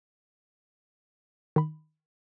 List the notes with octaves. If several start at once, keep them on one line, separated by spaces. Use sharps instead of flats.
D#3 B5